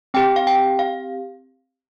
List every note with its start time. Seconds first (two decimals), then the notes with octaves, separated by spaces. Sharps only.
0.14 C4 G4 G5
0.36 F5
0.47 G5
0.79 F5